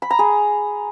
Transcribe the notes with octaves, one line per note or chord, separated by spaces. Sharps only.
B5
A#5
G#4